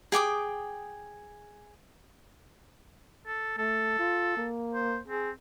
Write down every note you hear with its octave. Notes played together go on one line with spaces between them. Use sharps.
G#4 G5 D6 D#6
A4
A3 A4
F4
A#3
C5
C4 G#4